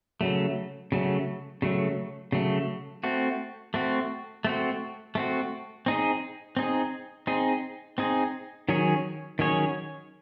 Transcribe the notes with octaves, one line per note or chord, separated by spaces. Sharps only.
C#3 F#3 A3
C#3 F#3 A3
C#3 F#3 A3
C#3 F#3 A3
A3 C4 F#4
A3 C4 F#4
A3 C4 F#4
A3 C4 F#4
C4 D#4 G#4
C4 D#4 G#4
C4 D#4 G#4
C4 D#4 G#4
D#3 F#3 C#4 G#4 C#5
D#3 F#3 C#4 G#4 C#5